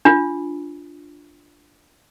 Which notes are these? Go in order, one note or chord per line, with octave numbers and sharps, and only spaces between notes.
D4 F4